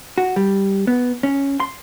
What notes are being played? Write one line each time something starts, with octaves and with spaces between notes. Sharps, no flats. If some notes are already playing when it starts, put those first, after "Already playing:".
F#4
G3
B3
C#4
C6